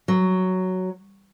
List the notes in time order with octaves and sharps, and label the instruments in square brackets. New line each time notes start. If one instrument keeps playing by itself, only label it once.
[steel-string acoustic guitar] F#3